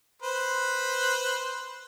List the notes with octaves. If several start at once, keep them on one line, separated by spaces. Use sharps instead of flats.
B4 C5